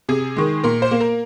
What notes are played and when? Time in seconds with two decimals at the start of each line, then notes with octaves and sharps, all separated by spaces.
0.09 C3 G#4
0.36 D#3 G#3
0.64 A#2 A#4
0.82 C5
0.91 A#3
1.01 A#4